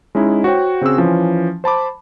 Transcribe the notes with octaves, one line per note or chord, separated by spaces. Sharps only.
G#3 C#4 D#4 E4
F#4 C5 C#5 F#5 G5
C#3 C4 F#4 G#4 E6
E3 F3 C#4
C5 A5 B5 D6